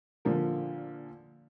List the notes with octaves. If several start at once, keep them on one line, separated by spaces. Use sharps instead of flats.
A#2 D3 F3 A#4